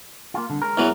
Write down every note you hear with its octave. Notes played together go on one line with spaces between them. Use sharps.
A#3 F4
C2 D3
G#3 C#4 A#4
E2 E3 F#3